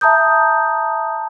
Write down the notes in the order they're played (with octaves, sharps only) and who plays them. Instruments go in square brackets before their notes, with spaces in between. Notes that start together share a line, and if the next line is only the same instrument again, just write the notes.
[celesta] E5 A5 A#5 D#6 G6